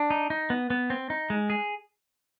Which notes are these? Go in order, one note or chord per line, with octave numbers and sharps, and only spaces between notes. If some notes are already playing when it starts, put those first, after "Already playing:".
Already playing: D4
D#4
D#4
B3
B3
C4
D#4
G#3
G#4